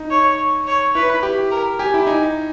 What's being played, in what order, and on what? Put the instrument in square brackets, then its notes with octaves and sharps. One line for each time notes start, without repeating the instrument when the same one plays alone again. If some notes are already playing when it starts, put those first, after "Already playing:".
Already playing: [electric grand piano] D#4
[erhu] C#5
C#5
[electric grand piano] E4 [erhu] B4
[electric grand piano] G4
[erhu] A#4
[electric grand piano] G4 [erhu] G#5
[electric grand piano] E4
[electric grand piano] D#4 [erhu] G#5